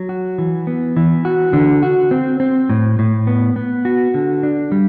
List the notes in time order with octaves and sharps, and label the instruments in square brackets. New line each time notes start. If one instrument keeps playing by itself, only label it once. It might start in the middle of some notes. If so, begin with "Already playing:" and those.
Already playing: [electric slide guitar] F#3
F#4
E3
B3
E3
F#4
D3
F#4
C4
C4
A2
A2
B3
B3
F#4
D3
D4
G3